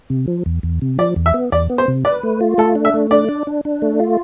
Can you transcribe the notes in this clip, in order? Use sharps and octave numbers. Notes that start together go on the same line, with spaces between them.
C3
F3
E2
E2
C3
F3 D5
E2
E5
B3
E2 D5
B3
C5
C3
B4 D5
A3
F4
A3 A4
D4
E5
A3
D4 D5
D4
D4
D4
A3
F4